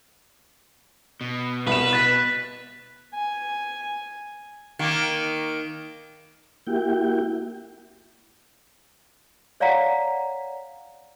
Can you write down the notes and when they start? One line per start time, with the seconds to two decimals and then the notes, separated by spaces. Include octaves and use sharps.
1.21 B2
1.67 C2 B4 E7
1.93 F#6 A6 B6
3.14 G#5
4.79 D#3 A#3
6.67 A#3 E4 F#4 G4 G5
9.60 C#5 D5 F5 F#5 A#5 B6